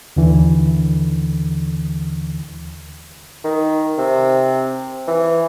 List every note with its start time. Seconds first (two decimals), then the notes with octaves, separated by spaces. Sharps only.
0.16 D#2 D3 E3
3.44 D#3
3.98 C3
5.07 E3